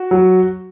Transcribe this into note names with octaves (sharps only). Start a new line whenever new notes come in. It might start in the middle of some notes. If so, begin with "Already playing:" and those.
Already playing: F#4
F#3